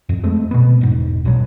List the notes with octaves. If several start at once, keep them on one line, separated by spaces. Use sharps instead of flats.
F2
G#3 A3 C4
B2 B3
E1 G#2
B1 B2 D3 F#3